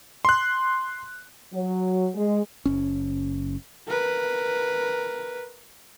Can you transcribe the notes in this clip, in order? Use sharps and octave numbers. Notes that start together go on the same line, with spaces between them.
C6 F#6
F#3
G#3
F#1 C#4
A#4 B4